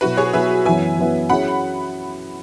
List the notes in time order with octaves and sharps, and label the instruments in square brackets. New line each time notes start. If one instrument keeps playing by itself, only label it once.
[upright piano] B2 F#3 E4 [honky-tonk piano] F#4 B4
[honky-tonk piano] G#4 C#5
[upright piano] B2 F#3 E4 [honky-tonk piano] B4 E5
[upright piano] F#2 E3 B3 E4 B4 [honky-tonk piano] E5 G#5
[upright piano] F#2 E3 B3 E4 B4
[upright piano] F#3 C#4 E4 G#4 C#5 [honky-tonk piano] F#5 B5